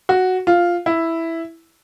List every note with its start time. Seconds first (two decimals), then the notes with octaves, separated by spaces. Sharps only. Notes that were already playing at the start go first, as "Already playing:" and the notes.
0.09 F#4
0.47 F4
0.86 E4